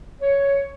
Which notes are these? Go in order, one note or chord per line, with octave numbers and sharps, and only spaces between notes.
C#5